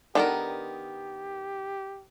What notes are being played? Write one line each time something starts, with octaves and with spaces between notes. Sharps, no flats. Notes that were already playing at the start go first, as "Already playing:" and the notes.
D#3 B3 D4 G4 A4 A#4 D5